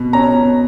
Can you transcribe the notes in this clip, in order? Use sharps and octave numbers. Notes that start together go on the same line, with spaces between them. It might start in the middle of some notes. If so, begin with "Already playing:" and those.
Already playing: B2
C#4 A#5
B2